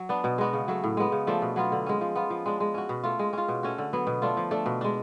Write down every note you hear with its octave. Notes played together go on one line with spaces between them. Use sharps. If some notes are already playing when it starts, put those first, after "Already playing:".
Already playing: F#3
B3 D4
B2
G#3 B3 F#4
C#3
F#3 A3
A2
G#3 B3
C#3
F3 A3 D4
B2
F#3 B3 F4
D3
G#3 C#4
F3
B3 F4
F3
G#3 D4
G#3
C#4 F#4
B2
A3 F4
G#3
C#4 F4
B2
A3 C#4 F#4
D3
F#3 B3
B2
A3 D4 F4
F3
A3 D4
B2
G#3 D4